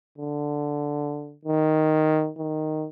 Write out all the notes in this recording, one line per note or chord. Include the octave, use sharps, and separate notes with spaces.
D3
D#3
D#3